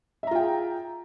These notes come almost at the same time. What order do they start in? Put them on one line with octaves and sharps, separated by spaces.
E5 A#5 F4 G5 G#4